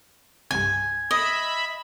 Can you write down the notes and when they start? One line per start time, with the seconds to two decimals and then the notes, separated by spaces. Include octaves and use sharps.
0.51 C2 G2 G#5 G#6
1.11 D#5 E5 B5